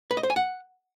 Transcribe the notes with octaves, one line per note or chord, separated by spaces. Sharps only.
B4
D#5
C5
G#5
F#5